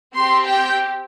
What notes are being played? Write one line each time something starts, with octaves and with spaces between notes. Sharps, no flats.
C4 G4 C6
G5